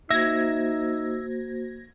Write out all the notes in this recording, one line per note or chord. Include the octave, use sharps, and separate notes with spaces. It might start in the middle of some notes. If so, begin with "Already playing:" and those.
A#3 D#4 F#4 C5 E5 G#6 A#6